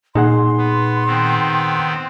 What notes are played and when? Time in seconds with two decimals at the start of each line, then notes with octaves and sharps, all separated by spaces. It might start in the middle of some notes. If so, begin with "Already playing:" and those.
0.15 A#2 D#4 G#4 F#5 C6
0.58 B3
1.06 D#3 B3 C4